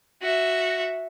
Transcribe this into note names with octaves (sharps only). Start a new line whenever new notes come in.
F#4 E5